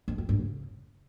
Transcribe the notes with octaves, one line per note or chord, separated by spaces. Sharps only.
F2
F2
G2
C#3